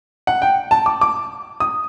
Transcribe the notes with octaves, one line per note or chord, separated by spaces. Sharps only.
F#5
G5
A5
D6
D6
D#6